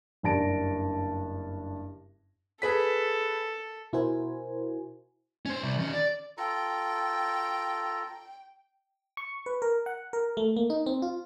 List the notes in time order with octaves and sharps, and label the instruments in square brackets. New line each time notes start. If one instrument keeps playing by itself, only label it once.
[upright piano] F#1 G2 D4 A5 A#6 D7
[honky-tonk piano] G#4 B4 B6 [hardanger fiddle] A4
[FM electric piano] B2 E4 F#4 A#4 C5 G#5
[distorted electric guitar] C#4 C5
C3 G3
D#3 C#4
D5
[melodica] F4 A4 A#5 [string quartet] G5
[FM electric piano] C#6
B4
A#4
F#5
A#4
A3
A#3
D#4
C4
F4